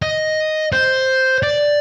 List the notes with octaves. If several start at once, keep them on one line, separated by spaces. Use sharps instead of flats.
D#5
C5
D5